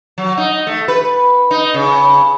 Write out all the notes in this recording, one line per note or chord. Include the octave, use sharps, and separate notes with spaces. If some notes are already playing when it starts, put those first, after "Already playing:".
F#3
D#4
A3
B4
D#4
C#3